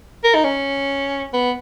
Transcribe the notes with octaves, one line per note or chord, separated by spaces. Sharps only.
A#4
D#4
C#4
B3